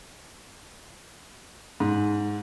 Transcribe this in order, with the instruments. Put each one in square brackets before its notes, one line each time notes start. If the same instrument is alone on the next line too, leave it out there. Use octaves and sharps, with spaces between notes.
[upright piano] G#2